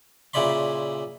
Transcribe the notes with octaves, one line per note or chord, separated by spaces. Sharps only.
A#2 C#3 E4 D5 B5 C6